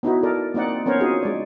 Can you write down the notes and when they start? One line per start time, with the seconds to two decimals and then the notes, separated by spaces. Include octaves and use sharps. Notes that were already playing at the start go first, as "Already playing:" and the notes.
0.03 B3 D#4 E4 F#4
0.23 A4 A#4 D5
0.54 A#3 C4 D#4 D5 F#5
0.86 B3 C#4 A#4 C5 C#5
1.01 D4 D#4 F4 F#4 G#4
1.23 G#3 D5